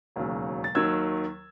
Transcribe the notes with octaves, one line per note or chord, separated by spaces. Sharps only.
E1 D#2 C#3 F#3
A6
D#2 D#3 F#3 E6 G#6